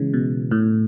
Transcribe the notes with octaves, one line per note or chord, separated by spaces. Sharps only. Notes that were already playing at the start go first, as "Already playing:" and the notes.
Already playing: C#3 E3 G#3
B2
A2